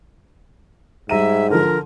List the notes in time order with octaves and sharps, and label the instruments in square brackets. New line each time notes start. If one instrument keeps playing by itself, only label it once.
[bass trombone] G#2 [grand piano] G3 A#5 D#7 [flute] E5
[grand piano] D3 F3 [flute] A#4